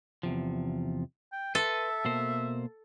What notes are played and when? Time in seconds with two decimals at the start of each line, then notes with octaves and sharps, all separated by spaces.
0.23 E2 C3 F3
1.32 G5
1.55 A4 B4 E5 C6
2.05 B2 A#3 C5